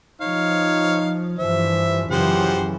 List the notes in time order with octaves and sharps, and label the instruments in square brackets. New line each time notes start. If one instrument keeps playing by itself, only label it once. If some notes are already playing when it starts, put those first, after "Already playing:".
[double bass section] F3 [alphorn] D#4 [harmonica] C#5 F5
[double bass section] G2 E3 F3 [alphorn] C5 [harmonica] E5
[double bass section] F#2 C#3 E3 [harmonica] F3 C5 F#5 [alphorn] G4